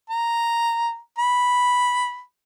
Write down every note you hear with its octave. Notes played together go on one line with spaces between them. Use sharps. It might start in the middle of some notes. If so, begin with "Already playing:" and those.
A#5
B5